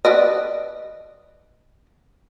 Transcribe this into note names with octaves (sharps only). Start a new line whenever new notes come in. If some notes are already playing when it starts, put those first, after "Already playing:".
B4 D5 D#5